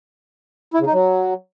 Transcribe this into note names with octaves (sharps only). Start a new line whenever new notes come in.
E4
C#3
D#4
F#3